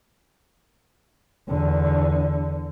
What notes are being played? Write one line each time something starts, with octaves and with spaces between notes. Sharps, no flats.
E2 D3